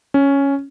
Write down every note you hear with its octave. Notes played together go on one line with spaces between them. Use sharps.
C#4